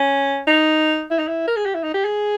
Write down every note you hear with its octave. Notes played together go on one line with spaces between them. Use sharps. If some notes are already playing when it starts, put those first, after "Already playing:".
Already playing: C#4
D#4
E4
D#4
E4
A#4
G#4
G4
E4
D#4
G4
G#4